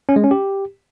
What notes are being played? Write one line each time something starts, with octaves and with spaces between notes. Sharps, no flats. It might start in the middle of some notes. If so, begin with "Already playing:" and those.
C#4
G#3
C#4
G4